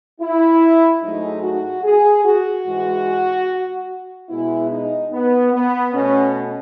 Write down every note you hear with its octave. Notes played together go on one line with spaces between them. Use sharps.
E4
G#2 F#3 A3 D#4
F#4
G#4
F#4
G#2 E3 G#3
B2 G#3 B3 E4
D#4
B3
B3
B2 A3 C#4